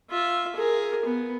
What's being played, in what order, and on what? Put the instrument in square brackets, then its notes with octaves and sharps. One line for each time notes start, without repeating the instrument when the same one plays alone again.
[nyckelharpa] F4 E5
G#4 A#4
B3